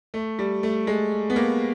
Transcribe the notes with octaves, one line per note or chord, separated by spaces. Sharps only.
A3
G3
A3
G#3
B3
A#3